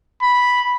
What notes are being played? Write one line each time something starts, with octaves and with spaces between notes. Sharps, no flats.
B5